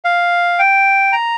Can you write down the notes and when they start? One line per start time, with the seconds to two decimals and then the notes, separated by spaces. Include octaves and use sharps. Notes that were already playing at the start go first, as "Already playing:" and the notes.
0.05 F5
0.59 G5
1.13 A#5